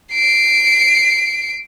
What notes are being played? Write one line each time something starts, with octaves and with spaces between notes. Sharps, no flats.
C7 D7